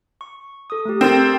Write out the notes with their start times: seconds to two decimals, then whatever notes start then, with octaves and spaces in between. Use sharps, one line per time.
0.21 C#6
0.70 A4 D#6
0.85 A3 G4
1.01 C4 A4 A#4 A6